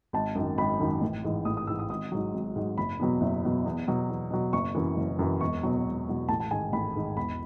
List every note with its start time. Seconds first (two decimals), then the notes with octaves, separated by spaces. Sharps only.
0.13 G#1 A5
0.35 F#2 D#3
0.58 G#1 B5
0.80 F#2 D#3
1.01 A1
1.24 G#2 E3
1.45 A1 D#6
1.57 D#6
1.67 G#2 E3 E6
1.79 D#6
1.89 G#1 D#6
2.12 G#2 F#3
2.34 G#1
2.56 G#2 F#3
2.78 F#1 B5
2.99 E2 B2 F#3
3.21 F#1
3.43 E2 B2 F#3
3.66 E2
3.87 B2 F#3
4.10 E2
4.31 B2 F#3
4.53 F#1 C#6
4.75 F#2 E3
4.97 F#1
5.19 F#2 E3
5.41 E1 C#6
5.63 E2 B2 F#3
5.85 E1
6.08 E2 B2 F#3
6.29 A1 A5
6.40 A5
6.51 G#2 D#3 G#5
6.73 A1 B5
6.95 G#2 D#3
7.16 E1 B5